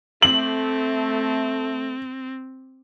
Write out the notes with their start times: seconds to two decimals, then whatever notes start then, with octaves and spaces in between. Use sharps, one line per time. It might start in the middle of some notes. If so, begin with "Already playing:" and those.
0.22 A3 C4 F#7